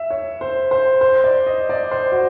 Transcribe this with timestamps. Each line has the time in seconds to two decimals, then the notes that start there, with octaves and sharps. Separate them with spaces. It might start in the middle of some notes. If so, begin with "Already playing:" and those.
Already playing: E5
0.10 C#5
0.41 C5
0.71 C5
1.01 C5
1.24 D5
1.46 D#5
1.69 D5
1.91 C5
2.12 F#4